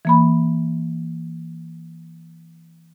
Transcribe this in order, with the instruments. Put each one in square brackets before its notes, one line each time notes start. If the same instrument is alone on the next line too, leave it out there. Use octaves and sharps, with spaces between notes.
[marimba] E3 A#3 B5